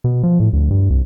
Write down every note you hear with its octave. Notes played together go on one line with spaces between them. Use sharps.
B2
F3
A2
D2
G2
C2